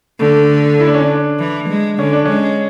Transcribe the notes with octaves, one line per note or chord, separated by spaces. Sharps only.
D3 A3
E4
D4
C#4
D4
E3
G#3
D3 C#4
D4
G#3 C#4